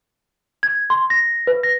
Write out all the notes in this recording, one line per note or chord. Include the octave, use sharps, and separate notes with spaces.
G#6
C6
A#6
B4
A#6